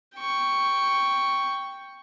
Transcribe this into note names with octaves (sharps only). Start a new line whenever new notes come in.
G5 C#6